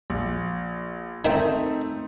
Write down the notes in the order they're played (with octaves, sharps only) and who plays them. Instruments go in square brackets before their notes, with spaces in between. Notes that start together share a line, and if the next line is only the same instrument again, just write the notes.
[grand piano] A#1
[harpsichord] D#3 E5 G5 [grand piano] A3 C4 D#4